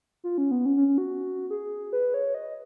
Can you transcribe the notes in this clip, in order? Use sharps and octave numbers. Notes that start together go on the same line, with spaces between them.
F4
C#4
B3
C#4
C#4
C#4
F#4
G#4
B4
C#5
D#5